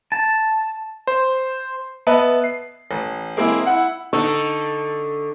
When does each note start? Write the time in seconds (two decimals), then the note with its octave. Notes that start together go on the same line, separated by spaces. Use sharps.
0.12 A5
1.07 C5
2.07 B3 B4 D#5 E5 A5
2.44 C7
2.91 A1
3.37 G#3 A#3 C4 E4 G#4
3.66 E4 F#5
4.13 D3 D#4 A4 C#6